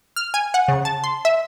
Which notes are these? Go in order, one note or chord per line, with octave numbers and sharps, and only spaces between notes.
F6
G#5
F#5
C#3
A5
C6
E5